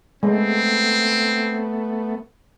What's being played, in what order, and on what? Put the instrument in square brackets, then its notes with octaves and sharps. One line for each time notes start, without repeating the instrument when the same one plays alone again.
[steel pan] G#3 [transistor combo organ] A3 B3 [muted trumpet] C4